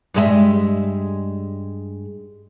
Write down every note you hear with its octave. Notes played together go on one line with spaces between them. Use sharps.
G2 G#3 E5